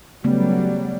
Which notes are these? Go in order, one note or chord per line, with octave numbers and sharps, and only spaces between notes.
C#3 F#3 G3 A3 B3